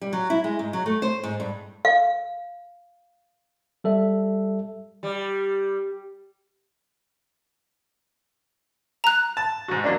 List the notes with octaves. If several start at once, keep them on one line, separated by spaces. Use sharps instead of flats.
G3
F#3
E4
G#3
G#2
F#3
A3
C5
G#2
G2
F5
G3 A4 E5
G3
A#5 F#6
A5
G#2 F#4
F#3 A#3 D4